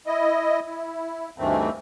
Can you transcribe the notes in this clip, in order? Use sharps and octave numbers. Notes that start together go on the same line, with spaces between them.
E4 D#5
E4
D2 G2 D#3 E3 A3 C4